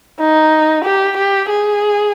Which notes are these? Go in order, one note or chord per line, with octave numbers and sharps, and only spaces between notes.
D#4
G4
G4
G#4